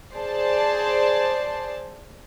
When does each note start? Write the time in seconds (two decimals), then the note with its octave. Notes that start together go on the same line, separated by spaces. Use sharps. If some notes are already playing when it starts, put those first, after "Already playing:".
0.14 G#4 C5 D5 A5